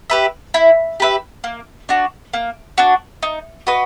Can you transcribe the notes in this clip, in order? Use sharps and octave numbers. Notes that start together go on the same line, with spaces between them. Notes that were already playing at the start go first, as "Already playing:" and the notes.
G4 B4 E5
E4
G4 B4 E5
A#3
D4 F#4
A#3
D4 F#4
D#4
F#4 B4 D#5